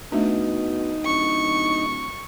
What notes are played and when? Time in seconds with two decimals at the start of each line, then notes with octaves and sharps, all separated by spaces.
0.12 B2 A3 D4 D#4
1.05 D1 C#6